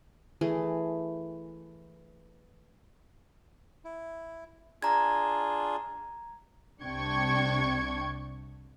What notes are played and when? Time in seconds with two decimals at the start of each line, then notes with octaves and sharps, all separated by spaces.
0.41 E3 A3 G#4
3.85 E4
4.82 D4 F4 G#4 A#5 G#6
6.82 C2 C3 D4 G5 C#6 G#6